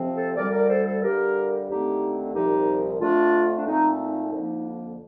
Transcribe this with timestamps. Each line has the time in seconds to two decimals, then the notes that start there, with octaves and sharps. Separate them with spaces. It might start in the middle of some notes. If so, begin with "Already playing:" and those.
Already playing: F2 C3 F3 C4
0.14 A4 C5
0.35 D2 D3 G3 A#4 D5
0.52 A#4 D5
0.69 A4 C5
0.86 A4 C5
1.02 G2 D3 G3 G4 A#4
1.68 D#2 D3 A3 C4 D#4 G4
2.34 C2 A#2 F3 C4 D#4 G4
3.00 F2 D3 A3 D4 F4
3.56 D4
3.66 A#2 A3 C4 D#4
3.99 D#4
4.33 F2 D3 F3 A#3